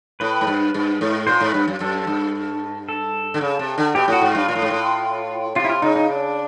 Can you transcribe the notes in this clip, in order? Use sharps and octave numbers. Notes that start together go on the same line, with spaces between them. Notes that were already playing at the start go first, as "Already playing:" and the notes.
A2 B4
G#2
G2
G2
G#2
A#2 C5
G#2 B4
G2
F#2
F#2 A4
G2
A4
D3
C#3
C3
D3
B2 G4
A2 F#4
G#2
G2 F4
A#2
A2
G#2
A2
C3 F4
E4
F4
C#3 D#4
D#4
D4